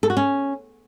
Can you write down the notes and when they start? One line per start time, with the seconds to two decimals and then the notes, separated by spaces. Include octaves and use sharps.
0.03 A4
0.10 F#4
0.17 C#4